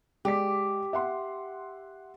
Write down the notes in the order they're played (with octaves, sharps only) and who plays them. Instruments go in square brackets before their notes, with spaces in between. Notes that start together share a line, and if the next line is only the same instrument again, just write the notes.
[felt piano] G#3 D5 B6 [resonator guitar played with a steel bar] G4
[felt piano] E5 F#5 C6